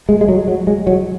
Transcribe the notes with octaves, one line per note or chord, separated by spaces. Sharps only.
G#3
G#3
F#3
F#3
G#3
F#3